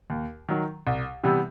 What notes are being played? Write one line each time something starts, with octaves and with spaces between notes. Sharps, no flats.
D#2
D#3 F#3
C2
C3 E3 G3 B3